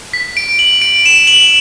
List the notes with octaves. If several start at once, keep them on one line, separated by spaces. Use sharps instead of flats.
B6
D7
F#7
D7
E7
F#7